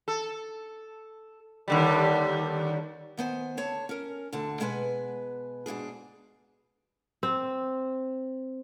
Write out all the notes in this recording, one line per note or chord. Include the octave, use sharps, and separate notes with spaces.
A4
D#2 D3 G3
D#3 B3 C5 G#5
D3 C#5 A5
C#4 A#4
D2 D3 A5
B2 G#3 B3 B4 G#5
G#2 B2 D4 G#4
C4